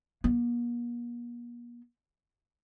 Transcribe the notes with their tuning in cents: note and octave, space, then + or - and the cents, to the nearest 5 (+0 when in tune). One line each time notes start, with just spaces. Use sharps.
A#3 +45